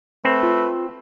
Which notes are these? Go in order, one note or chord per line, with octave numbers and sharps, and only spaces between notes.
A3 C4 B4
F4